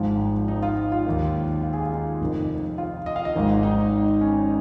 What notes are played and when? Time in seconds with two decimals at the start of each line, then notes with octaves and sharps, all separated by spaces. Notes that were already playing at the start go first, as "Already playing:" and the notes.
Already playing: G#1 G#2 F3
0.48 D#4
0.62 F4
0.92 F4
1.06 D#2 D#3
1.63 F4
1.73 G#4
1.82 F4
1.92 D#4
2.21 F1 F2 D#3
2.78 F4
3.06 D#5
3.16 F5
3.25 D#5
3.35 G#1 G#2 D#3
3.63 D#4
4.21 C#4